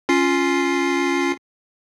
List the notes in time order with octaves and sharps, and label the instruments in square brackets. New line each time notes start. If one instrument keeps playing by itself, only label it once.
[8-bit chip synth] C#4 F4 C7